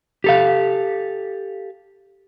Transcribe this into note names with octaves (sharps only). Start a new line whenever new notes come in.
G4 A4 F5